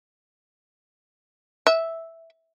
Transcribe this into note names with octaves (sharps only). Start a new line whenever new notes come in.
E5